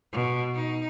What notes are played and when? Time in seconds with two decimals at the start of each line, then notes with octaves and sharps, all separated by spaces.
0.13 B2
0.55 D#4